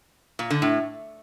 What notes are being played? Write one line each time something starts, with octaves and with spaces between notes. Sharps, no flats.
A#2
D3
A2